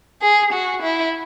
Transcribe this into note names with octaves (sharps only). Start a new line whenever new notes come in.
G#4
F#4
E4